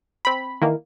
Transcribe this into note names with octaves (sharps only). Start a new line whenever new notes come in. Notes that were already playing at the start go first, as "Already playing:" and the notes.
C4 B5
D#3 E3 A#3